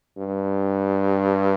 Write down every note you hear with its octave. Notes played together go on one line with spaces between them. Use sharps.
G2